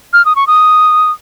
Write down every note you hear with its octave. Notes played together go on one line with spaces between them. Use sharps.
F6
D#6
C#6
D#6